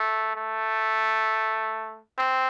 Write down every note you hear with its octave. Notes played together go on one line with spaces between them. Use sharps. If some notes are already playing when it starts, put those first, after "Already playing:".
Already playing: A3
A3
C4